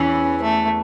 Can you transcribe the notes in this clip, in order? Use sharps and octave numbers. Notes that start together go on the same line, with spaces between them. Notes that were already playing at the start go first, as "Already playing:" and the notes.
Already playing: E2 E3 C#4
A3